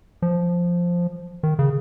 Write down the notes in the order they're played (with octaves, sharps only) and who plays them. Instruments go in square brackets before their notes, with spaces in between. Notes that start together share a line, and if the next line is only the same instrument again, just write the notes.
[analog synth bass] F3
D#3
C#3